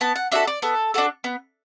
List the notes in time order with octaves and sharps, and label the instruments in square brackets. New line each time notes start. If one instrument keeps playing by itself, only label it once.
[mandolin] B3 A5
F#5
D4 F#4 A4 E5
D5
B3 A4
D4 F#4 A4
B3